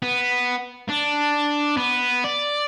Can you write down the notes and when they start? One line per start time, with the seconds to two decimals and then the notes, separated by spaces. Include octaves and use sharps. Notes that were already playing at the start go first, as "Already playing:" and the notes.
0.03 B3
0.89 D4
1.77 B3
2.24 D5